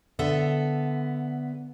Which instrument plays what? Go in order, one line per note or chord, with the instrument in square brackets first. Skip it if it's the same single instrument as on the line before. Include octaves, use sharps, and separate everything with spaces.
[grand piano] D3 [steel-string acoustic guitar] B3 A4 E5